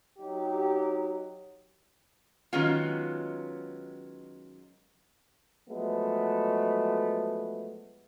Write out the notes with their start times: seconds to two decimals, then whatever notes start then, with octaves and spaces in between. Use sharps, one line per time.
0.19 F#3 D#4 G4
2.53 D#3 F#3 G#3 B3 C#4 F4
5.70 F3 F#3 G#3 A3 B3